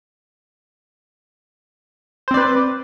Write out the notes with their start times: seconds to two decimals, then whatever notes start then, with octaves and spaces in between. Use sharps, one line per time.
2.28 C5
2.31 C4
2.34 D5
2.37 B4